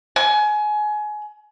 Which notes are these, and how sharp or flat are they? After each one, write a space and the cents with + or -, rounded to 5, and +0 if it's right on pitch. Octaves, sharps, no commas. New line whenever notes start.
G#5 +25